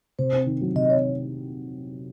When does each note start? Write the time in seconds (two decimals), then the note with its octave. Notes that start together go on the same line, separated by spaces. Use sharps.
0.19 C3 C5
0.33 C4
0.46 D#3
0.61 F#3
0.75 C3 D#5
0.90 C4 C#5